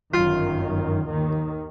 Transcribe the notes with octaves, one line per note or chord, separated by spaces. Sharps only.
G1 F#2 D#3 F4
D#2 D#3